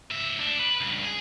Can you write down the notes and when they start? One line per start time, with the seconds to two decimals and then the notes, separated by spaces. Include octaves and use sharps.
0.11 G#2 E5
0.39 D2 D4
0.59 B4
0.81 C#2 G2
1.05 G#4